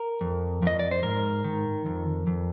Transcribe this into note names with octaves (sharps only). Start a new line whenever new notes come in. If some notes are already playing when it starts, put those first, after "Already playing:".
Already playing: A#4
F2
F2 D#5
D5
C5
G#2 A#4
D#3
F2
F2